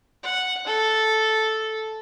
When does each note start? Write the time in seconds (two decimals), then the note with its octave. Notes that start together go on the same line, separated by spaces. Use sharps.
0.23 F#5
0.67 A4